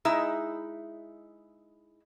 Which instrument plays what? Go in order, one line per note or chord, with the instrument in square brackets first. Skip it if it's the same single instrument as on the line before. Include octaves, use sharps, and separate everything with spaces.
[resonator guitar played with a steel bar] G#3 D#4 E4 E5